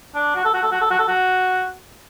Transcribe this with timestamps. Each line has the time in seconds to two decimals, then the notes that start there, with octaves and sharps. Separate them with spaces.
0.15 D4
0.36 F#4
0.45 A4
0.54 F#4
0.63 A4
0.72 F#4
0.81 A4
0.90 F#4
0.99 A4
1.08 F#4